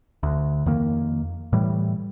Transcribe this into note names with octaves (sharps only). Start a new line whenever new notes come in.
D2
F2 D#3 A#3
A2 E3 G3